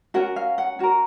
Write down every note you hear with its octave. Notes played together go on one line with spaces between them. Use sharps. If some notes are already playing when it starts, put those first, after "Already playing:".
C#4 F#4 A#4 F#5
F5
F#5
C#4 F#4 A#4